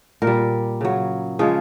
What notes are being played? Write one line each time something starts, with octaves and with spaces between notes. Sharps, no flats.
A#2 A#4
G3
C#3 F#3
C#3 F3 G#3 G#4